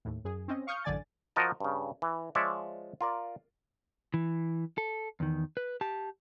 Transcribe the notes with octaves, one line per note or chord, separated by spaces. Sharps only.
D#2 A2
F#2 G#4
C4 C#4 D#5
F5 C#6 D#6 F6 G6 C#7
A1 F#2 D3 D5 G#5 A6
F3 F#4 A#4 D#5 A5
G2 C#3
E3
F3 G#3 C#5 D5 E5
F4 A#4 D5
E3
A4
E2 D#3
B4
G4 A5